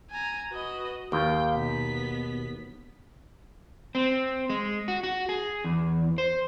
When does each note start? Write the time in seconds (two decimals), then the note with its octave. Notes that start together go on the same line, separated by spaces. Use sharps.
0.11 G#5 A#5
0.51 F#4 B4 D#5
1.12 D#2 F5 G5
1.56 B2 B3 B6
3.95 C4
4.50 G#3
4.88 F#4
5.03 F#4
5.29 G#4
5.64 E2
6.18 C5